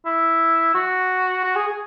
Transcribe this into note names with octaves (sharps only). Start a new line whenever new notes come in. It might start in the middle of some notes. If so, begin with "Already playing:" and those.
E4
F#4
F#4
G#4
G#4